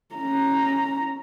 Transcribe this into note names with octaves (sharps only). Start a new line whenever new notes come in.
C#4 A#5